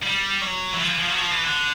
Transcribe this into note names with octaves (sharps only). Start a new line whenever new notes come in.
G3
F#3
E3
F3
E3
F3
F#3
F3
E3
D3